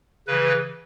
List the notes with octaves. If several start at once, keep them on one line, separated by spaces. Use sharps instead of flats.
C#3 E3 B4